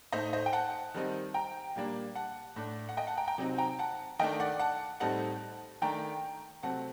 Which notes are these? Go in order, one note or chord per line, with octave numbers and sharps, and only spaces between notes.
A2 A3 D#4 C5 D#5
C5 D#5
G5
F#5 A5
D#3 G3 C4 D#4
G5 A#5
A#2 G3 A#3 D4
F#5 A5
A2 A3 D4
F#5
D#5 G5
F#5 A5
G5 A#5
G5 A#5
C3 F#3 C4 D#4
G5 A#5
F#5 A5
D#3 A3 D4 D#5 G5
D5 F#5
F#5 A5
A2 G3 C4 D#4 F#5 A5
D#3 A3 D4 G5 A#5
C3 F#3 A3 C4 F#5 A5